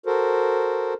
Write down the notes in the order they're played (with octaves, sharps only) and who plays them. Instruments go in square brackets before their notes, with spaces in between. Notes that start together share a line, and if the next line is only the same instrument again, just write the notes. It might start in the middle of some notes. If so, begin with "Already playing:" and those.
[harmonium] F#4 A4 A#4 C5